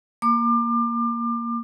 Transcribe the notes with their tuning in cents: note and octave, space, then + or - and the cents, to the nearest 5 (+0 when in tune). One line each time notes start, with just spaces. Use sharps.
A#3 +0 D6 +30